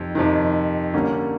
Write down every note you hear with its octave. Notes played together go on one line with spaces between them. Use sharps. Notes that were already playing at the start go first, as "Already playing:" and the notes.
Already playing: F2 C3 D#3
F2 C3 D#3
D3 G3 A#3 C#4